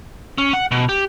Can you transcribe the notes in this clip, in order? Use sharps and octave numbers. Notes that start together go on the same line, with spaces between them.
C#4
F#5
B2
G4